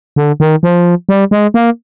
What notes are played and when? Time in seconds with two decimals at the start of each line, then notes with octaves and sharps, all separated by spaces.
0.16 D3
0.40 D#3
0.63 F3
1.09 G3
1.31 G#3
1.54 A#3